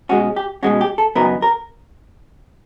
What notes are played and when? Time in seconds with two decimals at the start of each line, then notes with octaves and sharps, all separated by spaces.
0.09 B2 G#3 C#4 F#4
0.36 G4
0.63 B2 G#3 C#4 F#4
0.81 G4
0.98 A4
1.15 F#2 C#3 F#3 B3 D#4 A#4
1.42 A#4